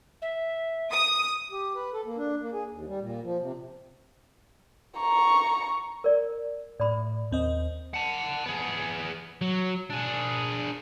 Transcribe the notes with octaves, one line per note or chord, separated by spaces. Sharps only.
E5
D#6
G4
B4
A4
A#3
D4
A#3
G#4
D#2
G3
A#2
F3
C3
A#5 C#6
A#4 D5
A2 D5 B5
D#2 C4 D#5
F#5 A5
B3 G#4
F#3
D4 G#4